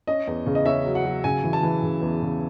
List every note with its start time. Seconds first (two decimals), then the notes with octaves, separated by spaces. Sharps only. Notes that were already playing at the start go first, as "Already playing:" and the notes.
0.07 C#4 D#5
0.27 E2
0.46 C#3
0.55 D#5
0.65 C#4 E5
0.85 F#3
0.95 F#5
1.05 F#3
1.24 C#3 G#5
1.44 E3
1.53 A5
1.63 E3
1.83 C#3
2.02 E2
2.22 C#3